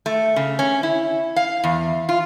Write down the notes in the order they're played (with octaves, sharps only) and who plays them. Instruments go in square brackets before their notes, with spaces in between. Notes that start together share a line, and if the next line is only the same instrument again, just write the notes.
[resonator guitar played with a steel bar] A3
C#3
C#4
E4
F5
E2
F4